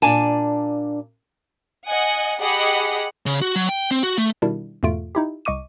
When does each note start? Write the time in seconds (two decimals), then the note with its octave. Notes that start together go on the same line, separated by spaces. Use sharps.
0.02 A#2 D4 D5 G#5 A5
1.85 D#5 F#5 G#5
2.39 G4 G#4 D#5 F#5 B5
3.26 C#3
3.42 F#4
3.56 F#3
3.69 G5
3.91 C4
4.03 F#4
4.18 A3
4.42 B2 D#3 G3 D4 E4
4.83 E2 G#2 B2 A3 F4 D7
5.15 D#4 E4 G4
5.45 C2 D#5 C#6 D6 D#7